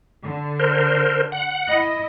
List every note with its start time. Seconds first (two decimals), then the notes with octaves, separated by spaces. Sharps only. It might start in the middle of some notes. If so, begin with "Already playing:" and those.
0.25 D3
0.60 A#4 C5
1.32 F#5
1.68 E4 D#5